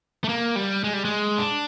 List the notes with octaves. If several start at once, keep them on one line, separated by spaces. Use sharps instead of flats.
A3
A#3
G3
G#3
G3
G#3
D4